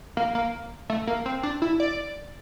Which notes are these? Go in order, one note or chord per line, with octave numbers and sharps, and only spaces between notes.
A#3
A#3
A3
A#3
C4
D4
E4
D5